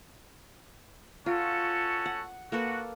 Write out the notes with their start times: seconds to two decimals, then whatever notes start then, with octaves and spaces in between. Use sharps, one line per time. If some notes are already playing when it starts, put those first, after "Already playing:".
1.26 C#4 F4 F#4 A4
2.06 F#5
2.52 A#3 F#4 A4 B4